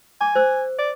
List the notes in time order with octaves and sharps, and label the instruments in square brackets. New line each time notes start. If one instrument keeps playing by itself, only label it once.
[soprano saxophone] G#5 [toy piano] D6
[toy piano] C5 E6
[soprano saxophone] D5